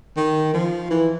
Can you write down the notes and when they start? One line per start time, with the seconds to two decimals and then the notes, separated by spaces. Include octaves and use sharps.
0.17 D#3
0.54 F3
0.90 E3